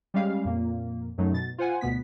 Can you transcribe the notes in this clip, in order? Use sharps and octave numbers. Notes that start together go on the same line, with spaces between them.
G3 G#3 C#4 G4 F5
F2 A#2 A#3
F#2 F#3 A3 D#4
B2 A6
F4 C5 F#5 G#5
D2 B2 B3 B6